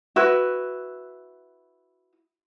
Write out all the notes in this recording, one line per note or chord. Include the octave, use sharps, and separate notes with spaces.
E4 F#4 B4